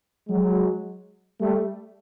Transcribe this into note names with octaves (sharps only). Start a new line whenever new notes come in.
F#3 G#3
G3 A3